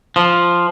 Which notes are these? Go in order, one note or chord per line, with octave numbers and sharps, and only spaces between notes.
F3